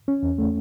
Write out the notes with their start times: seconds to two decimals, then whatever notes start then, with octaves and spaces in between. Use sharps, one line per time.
0.08 C#4
0.23 E2
0.38 A3